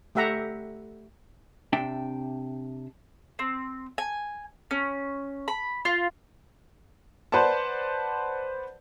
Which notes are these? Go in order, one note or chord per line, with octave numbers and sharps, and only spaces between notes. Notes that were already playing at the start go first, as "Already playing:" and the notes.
A3 G4 E5 F#5 A#5
C3 D4 E5 G5
C4
G#5
C#4
B5
F4
B4 C5 D5 F#5 A5